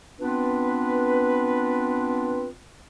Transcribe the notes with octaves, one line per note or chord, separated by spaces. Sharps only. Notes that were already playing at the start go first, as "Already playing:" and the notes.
B3 C4 D4 F4 B4